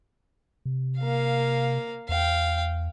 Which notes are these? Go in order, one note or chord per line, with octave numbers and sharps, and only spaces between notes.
C3
A#3 F5
E2 F5 G5